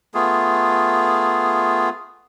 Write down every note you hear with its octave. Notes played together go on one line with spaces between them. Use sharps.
A3 B3 F4 G#4